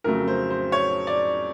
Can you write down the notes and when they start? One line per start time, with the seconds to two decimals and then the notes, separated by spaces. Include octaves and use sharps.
0.04 F2 C#3 F#3 A3 A#4
0.28 C5
0.50 C5
0.72 C#5
1.07 D5